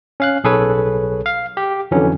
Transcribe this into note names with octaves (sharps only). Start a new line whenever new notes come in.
C#4 F5 F#6
B1 G#4 A4 B4 C#5
F5
G4
F2 D3 E3 F#3 C#4